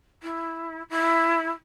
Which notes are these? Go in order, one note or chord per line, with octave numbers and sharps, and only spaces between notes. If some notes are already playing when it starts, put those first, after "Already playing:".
E4
E4